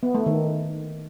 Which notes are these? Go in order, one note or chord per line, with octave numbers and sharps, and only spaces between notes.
B3
A3
D#3